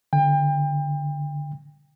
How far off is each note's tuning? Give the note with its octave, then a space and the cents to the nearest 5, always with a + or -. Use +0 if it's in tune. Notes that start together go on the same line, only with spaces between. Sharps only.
D3 +0 G5 +30